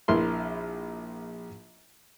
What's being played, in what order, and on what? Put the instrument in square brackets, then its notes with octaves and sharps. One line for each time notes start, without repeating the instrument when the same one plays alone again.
[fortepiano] A#1 E4 A#4 C6